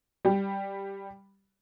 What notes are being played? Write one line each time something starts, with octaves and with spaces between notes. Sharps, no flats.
G3 G4